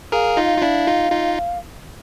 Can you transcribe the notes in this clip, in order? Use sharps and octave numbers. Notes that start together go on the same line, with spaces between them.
G#4 A#4 F5
D#4 F4
F4
D4 E4 F5
D#4 F4
D#4 F4